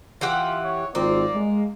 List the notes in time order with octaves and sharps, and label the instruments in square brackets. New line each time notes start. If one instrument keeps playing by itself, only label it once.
[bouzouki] E3 G4 F#5 [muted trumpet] F4
[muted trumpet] C#5
[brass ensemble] G#1 C4 F4 [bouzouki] A#3 [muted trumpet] D5
[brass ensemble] G#3